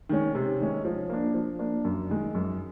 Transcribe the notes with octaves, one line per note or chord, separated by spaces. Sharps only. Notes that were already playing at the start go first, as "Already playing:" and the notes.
D#3 G#3 C#4
C3
D#3 G#3 C#4
F3
A#3 D4
F3
A#3 D4
F#2
D#3 G#3
F#2